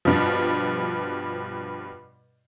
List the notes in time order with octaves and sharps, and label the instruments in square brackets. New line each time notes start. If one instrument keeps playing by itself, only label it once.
[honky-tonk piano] G2 B2 F3